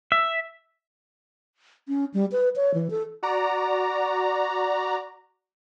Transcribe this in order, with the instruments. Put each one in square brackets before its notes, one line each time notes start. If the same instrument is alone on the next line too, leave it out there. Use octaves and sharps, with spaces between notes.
[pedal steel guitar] E5
[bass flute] C#4
G3
B4
C#5
E3
A4
[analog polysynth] F#4 D5 A#5